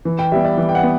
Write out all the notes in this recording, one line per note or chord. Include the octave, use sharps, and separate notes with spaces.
E3
G5
G3 B3 E5
D5
E3
G5
F#5
B3